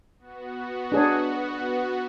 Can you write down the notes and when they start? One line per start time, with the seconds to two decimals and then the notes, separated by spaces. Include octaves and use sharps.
0.18 B3 F#4
0.92 D4 G#4 C#5